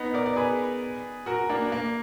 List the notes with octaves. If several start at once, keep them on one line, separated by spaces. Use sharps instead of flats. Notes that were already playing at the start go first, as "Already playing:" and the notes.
Already playing: B3 D#4
A#4 D5
D5
G#4 B4
F#4 A#4
A#3 D4
A#3